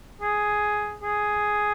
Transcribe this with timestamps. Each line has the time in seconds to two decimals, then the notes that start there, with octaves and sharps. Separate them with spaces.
0.21 G#4
1.03 G#4